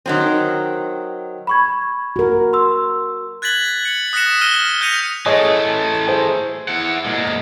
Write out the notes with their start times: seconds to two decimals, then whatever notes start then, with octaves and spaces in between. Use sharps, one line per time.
0.06 D#3 F#3 C4
1.47 B5 C#6 G#6
2.16 F#4 A#4
2.53 C6 E6
3.42 F#6 G#6 A6 B6 F#7
3.85 C#7
4.13 D#6 F#6 A#6 B6 C#7 E7
4.41 F6 A#6 D#7 G7
4.81 F6 G6 A#6 C#7 D#7 F7
5.26 E3 A3 G#4 C#5 D#5
6.08 G#4 C5
6.68 E4 F#5
7.05 A#2 G#3